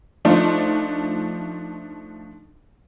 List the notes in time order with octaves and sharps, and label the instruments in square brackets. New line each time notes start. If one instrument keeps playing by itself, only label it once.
[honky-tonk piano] F3 A3 D4 D#4 F4 C5